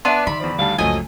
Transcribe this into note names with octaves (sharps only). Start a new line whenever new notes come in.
B3 D4 B4 D5 E5 C6
D#3 B5
E2 F3 D5
D2 D#3 G3 F5 A5
C#2 F#2 F3 F#3 A3 D#5 G#5